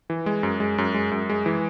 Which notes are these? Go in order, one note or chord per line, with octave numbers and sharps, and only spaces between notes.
E3
G#3
F#2
G#3
F#2
G#3
F#2
G#3
E3